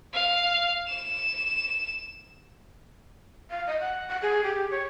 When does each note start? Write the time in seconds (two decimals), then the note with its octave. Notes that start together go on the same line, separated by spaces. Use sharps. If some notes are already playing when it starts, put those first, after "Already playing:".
0.13 F5
0.88 E7
3.50 F5
3.67 D#5
3.80 F#5
4.09 F#5
4.22 G#4
4.44 G4
4.71 C#5